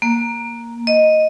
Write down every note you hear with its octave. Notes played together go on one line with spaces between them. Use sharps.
A#3
D#5